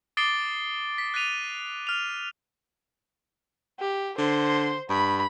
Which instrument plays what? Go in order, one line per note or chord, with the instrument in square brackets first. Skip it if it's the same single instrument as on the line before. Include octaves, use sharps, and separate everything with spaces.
[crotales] D6 D#6 A6 C7 D7 G7
B6
F#6 A6 B6 D#7 F7
F6 F7
[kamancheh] G4
[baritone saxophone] D3 [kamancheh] C5 C6
[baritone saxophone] G2 [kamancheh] B5